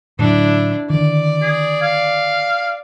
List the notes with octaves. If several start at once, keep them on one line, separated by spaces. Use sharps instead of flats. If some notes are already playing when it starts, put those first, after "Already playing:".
A2 D3 F#3 D4 E4
D3 D#3 D5
G#4
F5